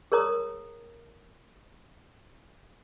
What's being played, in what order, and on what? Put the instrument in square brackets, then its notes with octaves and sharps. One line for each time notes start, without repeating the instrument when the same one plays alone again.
[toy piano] G#4 A#4 C#5 A#5 D#6